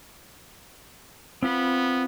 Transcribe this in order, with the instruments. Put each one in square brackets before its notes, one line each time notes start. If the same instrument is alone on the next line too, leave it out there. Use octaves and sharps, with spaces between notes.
[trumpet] B3 [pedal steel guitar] C4 F4 B5